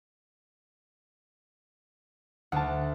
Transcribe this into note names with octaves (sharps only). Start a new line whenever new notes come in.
D2 F#5 A5